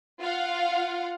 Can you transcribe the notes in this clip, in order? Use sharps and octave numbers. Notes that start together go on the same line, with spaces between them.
F4 F5 F#5